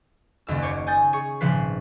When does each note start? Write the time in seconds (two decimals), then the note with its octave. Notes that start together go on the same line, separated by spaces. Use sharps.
0.47 F#1 D#2 E6
0.62 C5 C#5 D6
0.87 G#5 D#6 G6 A6
1.13 G#4 C#5 C#6
1.41 G#1 A#2 C#3 F3 B4 C7